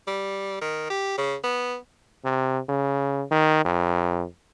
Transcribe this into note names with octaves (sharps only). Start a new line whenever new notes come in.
G3
D#3
G4
C#3
B3
C3
C#3
D#3
F2